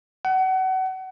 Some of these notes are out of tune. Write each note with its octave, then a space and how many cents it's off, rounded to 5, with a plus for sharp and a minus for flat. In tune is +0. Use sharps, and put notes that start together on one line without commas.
F#5 +30